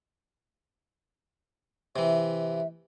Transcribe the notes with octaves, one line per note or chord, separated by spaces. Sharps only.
C3 E3 E5